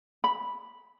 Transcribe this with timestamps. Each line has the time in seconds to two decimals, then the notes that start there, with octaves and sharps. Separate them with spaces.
0.24 B5